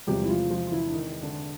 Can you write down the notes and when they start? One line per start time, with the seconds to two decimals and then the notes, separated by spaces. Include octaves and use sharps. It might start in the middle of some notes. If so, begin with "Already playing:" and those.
0.07 E2 C3 F3 G3 G#3 G4
0.24 E4
0.29 F3 F4
0.50 F3 F4
0.67 F4
0.72 E3 E4
0.87 D4
0.93 D#3 D#4
1.22 D3 D4